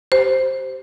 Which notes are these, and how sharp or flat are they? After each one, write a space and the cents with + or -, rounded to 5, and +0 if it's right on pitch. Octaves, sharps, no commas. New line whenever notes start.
G4 -20 C5 +0